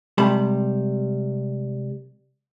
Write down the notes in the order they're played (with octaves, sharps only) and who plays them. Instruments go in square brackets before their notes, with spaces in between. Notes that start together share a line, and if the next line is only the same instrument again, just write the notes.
[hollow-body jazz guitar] C2 C3 G3 G#3 A5 B5